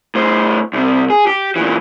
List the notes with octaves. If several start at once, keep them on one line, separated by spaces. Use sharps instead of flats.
A2 C5
C2 C3
G#4
G4
A#2 E3